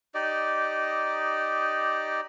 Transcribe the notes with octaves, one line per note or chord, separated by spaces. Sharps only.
D#4 G4 D5 D#5